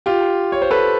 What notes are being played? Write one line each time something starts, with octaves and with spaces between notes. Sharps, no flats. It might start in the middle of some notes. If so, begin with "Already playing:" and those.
F4 G4
C#5
C5
A4 B4